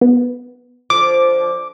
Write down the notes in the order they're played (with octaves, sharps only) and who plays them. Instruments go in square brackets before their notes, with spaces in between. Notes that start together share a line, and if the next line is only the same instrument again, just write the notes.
[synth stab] B3
[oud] D3 F3 [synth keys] D6